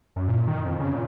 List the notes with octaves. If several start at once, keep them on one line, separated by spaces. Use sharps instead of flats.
F#2
A#2
D#3
F2
C#3
A#2